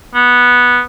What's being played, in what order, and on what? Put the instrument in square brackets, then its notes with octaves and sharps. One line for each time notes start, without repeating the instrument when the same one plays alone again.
[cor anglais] B3